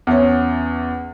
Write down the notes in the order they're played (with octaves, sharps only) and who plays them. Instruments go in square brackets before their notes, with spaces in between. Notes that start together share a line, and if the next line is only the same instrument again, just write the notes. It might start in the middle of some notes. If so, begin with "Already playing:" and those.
[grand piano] E2 C#4